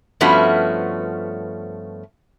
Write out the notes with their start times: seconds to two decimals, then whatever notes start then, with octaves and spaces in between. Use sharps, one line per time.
0.21 G2 F3 A3 B3 C#4 F#4